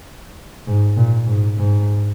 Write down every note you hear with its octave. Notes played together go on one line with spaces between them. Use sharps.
G#2
A#2
G#2
G#2